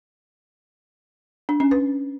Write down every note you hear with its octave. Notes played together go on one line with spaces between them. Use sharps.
D4
C#4
B4